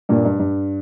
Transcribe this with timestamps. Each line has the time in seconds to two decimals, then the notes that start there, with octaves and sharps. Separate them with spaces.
0.09 G2 A#2
0.25 G2
0.39 G2